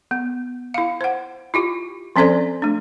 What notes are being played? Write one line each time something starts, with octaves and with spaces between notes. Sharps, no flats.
B3
E4 F5
C5 F#5
E4 F4 G4
F3 C4 C#4 A4 C5 D5
A3 D4